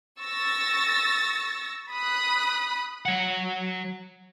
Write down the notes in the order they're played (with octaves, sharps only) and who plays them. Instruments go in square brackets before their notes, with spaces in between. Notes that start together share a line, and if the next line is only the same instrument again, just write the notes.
[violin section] C#6 E6 A6 A#6
B5 D#6 F#6
[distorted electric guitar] F#3 F#5